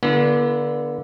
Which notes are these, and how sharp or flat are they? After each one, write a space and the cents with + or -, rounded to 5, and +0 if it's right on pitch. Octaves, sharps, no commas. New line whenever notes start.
D3 -10 B3 -40 E4 +40